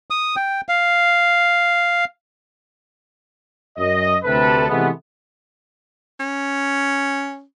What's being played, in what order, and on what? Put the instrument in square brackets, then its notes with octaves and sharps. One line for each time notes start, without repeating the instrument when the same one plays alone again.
[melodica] D#6
G5
F5
[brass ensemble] F#2 D#5
D2 C3 A4 B4
C3 E3 G#3 A3 B3
[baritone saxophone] C#4